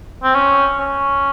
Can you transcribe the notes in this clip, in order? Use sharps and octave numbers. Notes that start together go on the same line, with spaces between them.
C4
C#4
C#4